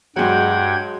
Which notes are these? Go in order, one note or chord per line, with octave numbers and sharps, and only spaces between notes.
G2 F#3 G#3 F#5 G5 G#6